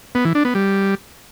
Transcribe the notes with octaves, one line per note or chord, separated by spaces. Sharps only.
B3
E3
D4
B3
G3